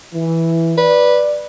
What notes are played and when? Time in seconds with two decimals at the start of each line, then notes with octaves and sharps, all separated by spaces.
0.14 E3
0.78 B4 D5